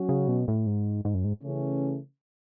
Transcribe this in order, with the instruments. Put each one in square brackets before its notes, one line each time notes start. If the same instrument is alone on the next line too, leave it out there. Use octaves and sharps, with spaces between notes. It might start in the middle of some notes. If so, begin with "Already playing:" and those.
Already playing: [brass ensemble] F#3 C#4 F#4
[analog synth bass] C#3
B2
A2
G#2
G#2
F#2
G#2
[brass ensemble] C#3 E3 A3 C#4